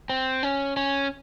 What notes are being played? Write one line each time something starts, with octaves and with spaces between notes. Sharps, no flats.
C4
C#4
C#4